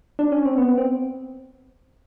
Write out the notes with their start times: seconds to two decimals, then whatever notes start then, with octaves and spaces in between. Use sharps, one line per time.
0.19 D4
0.32 C#4
0.45 C4
0.58 B3
0.78 C4